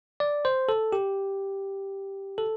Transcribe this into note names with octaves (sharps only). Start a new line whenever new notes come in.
D5
C5
A4
G4
A4